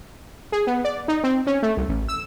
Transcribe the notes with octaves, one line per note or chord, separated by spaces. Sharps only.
G#4
B3
D5
D#4
C4
C#4
A3
C2
A1
E6